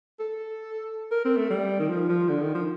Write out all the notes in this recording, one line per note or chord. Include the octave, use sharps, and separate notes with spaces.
A4
A#4
C4
A3
G3
D#3
F3
F3
D3
D#3
F3